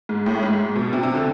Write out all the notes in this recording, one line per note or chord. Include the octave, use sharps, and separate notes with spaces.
G#2
A2
G#2
B2
C3
C3
D3